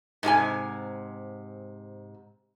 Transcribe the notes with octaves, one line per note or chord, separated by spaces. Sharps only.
G#2 C3 G4 G#5